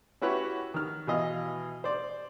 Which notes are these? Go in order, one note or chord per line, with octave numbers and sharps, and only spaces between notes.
C#4 E4 F#4 G4 B4 C#5
D#3 F6
B2 E3 D#5 F5
C5 D5